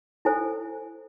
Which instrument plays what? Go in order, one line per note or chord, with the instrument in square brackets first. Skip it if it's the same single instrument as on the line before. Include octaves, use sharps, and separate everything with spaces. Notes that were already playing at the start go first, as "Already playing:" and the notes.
[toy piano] E4 A4 C5 G#5